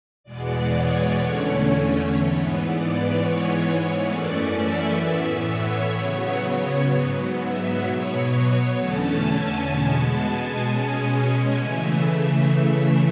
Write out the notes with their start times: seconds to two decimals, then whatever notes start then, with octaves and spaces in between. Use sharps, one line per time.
0.24 E2 B2 G#3 B3 D5
0.71 C#5
1.18 E2 D3 A3 C#4
2.13 G#2 E3 B3
2.60 D5
3.07 G#2 E3 G#3 B3 C#5
3.55 C#5
4.02 F#2 E3 A3 C#4 D5
4.49 E5
4.96 A2 E3 B3
5.44 C#5
5.91 C#3 F#3 B3
6.86 G#2 F#3 B3
7.32 E5
7.80 B2 F#3 B3 C#5
8.75 E2 D3 A3 C#4 A5
9.22 G#5
9.69 B2 G#3 B3 A5
10.17 G#5
10.64 B2 G#3 C#4
11.11 G#5
11.58 C#3 E3 A3 E5